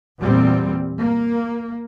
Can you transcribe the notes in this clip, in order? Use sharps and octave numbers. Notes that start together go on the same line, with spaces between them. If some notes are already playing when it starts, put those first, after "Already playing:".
E2 A#2 G3 C4
A#3